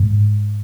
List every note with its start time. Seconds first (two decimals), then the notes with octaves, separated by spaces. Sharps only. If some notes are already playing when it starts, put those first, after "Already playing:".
Already playing: G#2